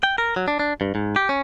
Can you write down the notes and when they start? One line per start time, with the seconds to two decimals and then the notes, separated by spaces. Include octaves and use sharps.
0.03 G5
0.18 A#4
0.36 F#3
0.48 D4
0.59 D4
0.81 G2
0.95 G#2
1.16 G4
1.29 C#4